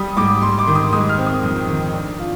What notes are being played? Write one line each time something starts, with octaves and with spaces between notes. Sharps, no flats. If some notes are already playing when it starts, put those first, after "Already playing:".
Already playing: G3 D#6
G#2 D6
G#2 C6
D6
D#3
D#6
G#3 D#6
F6
C4
D#6
F2
D#3
D4
F4